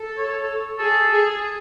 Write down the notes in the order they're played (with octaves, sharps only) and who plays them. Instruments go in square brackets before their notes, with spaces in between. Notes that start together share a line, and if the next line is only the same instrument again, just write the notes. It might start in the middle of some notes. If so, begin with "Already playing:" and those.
Already playing: [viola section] A4
[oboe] C#5
[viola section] G#4 [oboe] A4
[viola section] G#4
[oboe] G#4